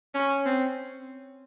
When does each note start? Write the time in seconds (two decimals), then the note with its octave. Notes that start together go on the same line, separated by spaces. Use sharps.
0.15 C#4
0.45 C4